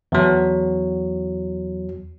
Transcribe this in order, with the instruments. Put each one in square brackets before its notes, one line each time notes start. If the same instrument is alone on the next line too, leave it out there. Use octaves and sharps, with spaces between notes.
[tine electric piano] E2 F#3